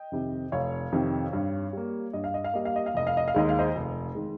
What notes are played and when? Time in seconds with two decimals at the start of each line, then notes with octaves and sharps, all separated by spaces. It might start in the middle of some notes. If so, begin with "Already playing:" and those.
Already playing: D#5 G5
0.12 F2 C3 D#3
0.52 F1 C#5 F5
0.92 F2 C3 D#3
1.33 G2
1.73 G3 A#3
2.13 G2 D#5
2.24 F5
2.34 D#5
2.44 F5
2.54 G3 A#3 D#5
2.65 F5
2.76 D#5
2.86 F5
2.94 F1 D#5
3.07 F5
3.17 D#5
3.28 F5
3.34 D#2 D#3 G#3 D#5
3.49 F5
3.59 C5 D#5
3.75 F1
4.15 D#3 G#3